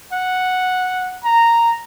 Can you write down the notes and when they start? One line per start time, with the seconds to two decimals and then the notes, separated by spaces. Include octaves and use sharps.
0.13 F#5
1.24 A#5